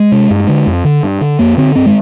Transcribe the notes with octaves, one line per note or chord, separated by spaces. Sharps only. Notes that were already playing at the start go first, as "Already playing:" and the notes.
Already playing: G#3
C3
G2
D3
F2
D3
G2
D3
F2 A#3
D3 C4
G2 C4
G#3